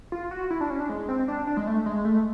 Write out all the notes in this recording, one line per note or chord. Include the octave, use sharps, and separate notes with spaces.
F4
F#4
E4
D4
C#4
D4
G#3
C4
D4
D4
G#3
A3
G#3
A3